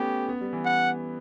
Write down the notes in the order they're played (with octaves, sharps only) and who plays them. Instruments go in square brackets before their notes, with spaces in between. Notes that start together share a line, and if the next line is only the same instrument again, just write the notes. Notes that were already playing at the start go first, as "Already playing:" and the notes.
Already playing: [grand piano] A3 B3 C#4 [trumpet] G4
[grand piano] B3
G3
E3
[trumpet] F#5